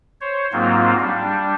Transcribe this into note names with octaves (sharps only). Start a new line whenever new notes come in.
C5 C#5
G#2 F#3 A#3 C4 F4
G3 D4